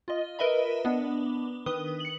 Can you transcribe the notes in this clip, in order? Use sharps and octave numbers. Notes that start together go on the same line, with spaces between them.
F4 D#5
A#4 B4 D#5 E5 B5
B3 D4
D#3 B4 D#6 G7
C#7 F#7